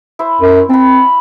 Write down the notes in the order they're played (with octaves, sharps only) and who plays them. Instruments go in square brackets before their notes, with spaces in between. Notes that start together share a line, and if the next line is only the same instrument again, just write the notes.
[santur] E4 C5
[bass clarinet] F#2
[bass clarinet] C4 [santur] A5 B5